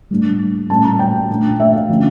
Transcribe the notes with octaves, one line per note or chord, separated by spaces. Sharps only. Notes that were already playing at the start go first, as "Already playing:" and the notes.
A2 G3 A#3 D4
A#2 G3 C#4 A5
A#5
G5
A#2 A3 D4
E5
F5
D3 F3 C#4